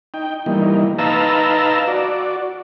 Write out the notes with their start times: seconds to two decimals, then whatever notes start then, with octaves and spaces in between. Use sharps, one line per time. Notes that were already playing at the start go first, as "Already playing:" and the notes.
0.14 D#4 G5
0.46 E3 G3 A#3 D#4
0.98 D#4 B4 F5 A5 A#5 E6
1.87 F#4 D5